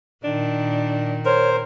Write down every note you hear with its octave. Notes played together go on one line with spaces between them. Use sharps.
A#2 D#3 D4
A#4 C5 C#5